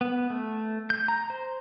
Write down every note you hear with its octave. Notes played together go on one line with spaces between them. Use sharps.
B3
A3
G6
A#5
C5